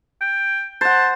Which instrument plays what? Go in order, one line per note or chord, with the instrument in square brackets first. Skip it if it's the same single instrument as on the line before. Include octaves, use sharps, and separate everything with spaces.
[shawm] G5
[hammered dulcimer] C5 F#5 [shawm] A5